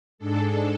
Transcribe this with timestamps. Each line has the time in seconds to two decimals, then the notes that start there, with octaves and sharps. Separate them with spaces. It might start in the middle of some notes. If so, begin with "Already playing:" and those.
0.18 G#2 G#3 D4 A4